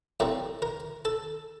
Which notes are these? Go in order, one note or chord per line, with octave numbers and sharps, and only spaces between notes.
A2 G3 C4 A#4
A#4
A4